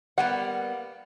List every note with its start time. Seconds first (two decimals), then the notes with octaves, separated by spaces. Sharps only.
0.18 G3 A#3 B3 F#5